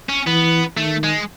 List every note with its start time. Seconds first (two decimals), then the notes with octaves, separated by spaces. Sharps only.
0.09 C#4
0.27 E3 B3
0.77 D#3 A3
1.03 G#3